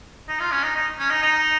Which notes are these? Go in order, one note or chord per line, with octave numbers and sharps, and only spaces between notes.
D#4
F4
C#4
D#4
D#4
C#4
D#4
D#4